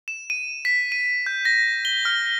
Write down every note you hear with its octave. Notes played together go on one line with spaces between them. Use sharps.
E7
D#7
B6
D#7
G6
A#6
G7
F6